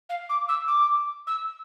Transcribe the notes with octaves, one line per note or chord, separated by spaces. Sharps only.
F5
D6
E6
D6
E6